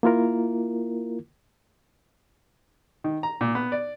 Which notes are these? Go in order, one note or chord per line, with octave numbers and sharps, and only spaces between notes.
A#3 E4 F4 A#4
D#3
A#5
A#2
B3
D5